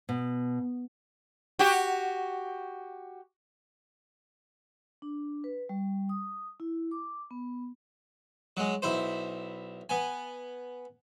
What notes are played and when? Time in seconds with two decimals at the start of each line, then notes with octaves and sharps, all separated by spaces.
0.09 B2
1.59 F#4 G4
5.02 D4
5.44 B4
5.69 G3
6.09 D#6
6.60 E4
6.91 D6
7.31 B3
8.57 F#3 G#3
8.82 B1 E4 C5
9.89 B3 G#5